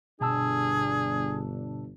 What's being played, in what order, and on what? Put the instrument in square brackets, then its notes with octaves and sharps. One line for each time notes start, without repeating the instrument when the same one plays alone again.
[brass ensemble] G1 D4 [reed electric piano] B2 A5 E6 [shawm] G#4